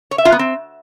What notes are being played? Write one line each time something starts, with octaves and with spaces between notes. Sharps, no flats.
C#5
E5
F4
B3
C4